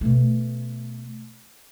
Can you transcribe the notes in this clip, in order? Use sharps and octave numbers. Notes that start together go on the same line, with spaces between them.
B2 A3